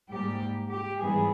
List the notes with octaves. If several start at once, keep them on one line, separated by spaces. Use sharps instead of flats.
G#2 G3 A#3 G4
G4
G#2 E3 G3 B3 G#4